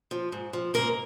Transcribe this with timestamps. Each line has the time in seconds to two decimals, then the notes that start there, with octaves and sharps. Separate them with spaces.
0.11 F3
0.32 G#2
0.53 F3
0.74 G#2 A#3 A#4